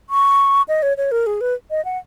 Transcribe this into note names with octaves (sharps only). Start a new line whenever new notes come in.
C#6
D#5
C#5
C#5
A#4
G#4
B4
D#5
F#5